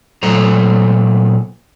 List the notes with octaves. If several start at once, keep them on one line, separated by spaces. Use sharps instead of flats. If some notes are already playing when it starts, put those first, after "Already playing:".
A#2 F#3 A4 C5 A#5